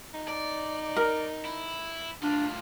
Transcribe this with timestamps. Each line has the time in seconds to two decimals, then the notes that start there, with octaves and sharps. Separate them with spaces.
0.14 D#4
0.28 D5
0.96 A#4
1.45 E4
2.23 A2 D4 F4